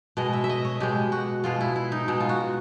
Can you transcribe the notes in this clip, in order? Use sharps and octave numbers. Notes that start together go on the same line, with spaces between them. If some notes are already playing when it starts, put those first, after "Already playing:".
B2 G#3 D#5
E5
E5
D#5
C#5
B2 G#3 G4
F#4
B2 G#3 F4
E4
E4
D#4
B2 G#3
F4
F#4